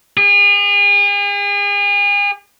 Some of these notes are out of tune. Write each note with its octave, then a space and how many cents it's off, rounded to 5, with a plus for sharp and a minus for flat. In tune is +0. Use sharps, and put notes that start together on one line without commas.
G#4 -40